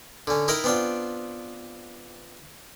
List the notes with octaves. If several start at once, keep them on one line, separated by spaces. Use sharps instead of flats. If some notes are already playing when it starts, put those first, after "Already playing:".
D3 C#4
D#4 E4 A#4 G5 A#5 B5
B3 C4 D4 F4 G5